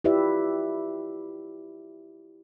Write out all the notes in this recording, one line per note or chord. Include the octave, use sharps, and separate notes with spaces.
E4 F4 G4 B4 D5 E5